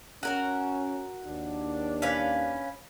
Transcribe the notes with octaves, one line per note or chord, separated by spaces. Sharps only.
C#4 F#4 A#4 F#5
D#2 D4
C#4 B4 F5